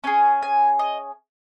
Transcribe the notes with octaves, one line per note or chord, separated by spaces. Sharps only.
C#4 G#4 G#5
G#5
D#5